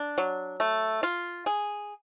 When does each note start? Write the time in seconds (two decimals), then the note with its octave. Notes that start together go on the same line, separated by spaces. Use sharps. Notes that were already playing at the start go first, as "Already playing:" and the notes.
Already playing: D4
0.18 F#3
0.60 A3
1.03 F4
1.46 G#4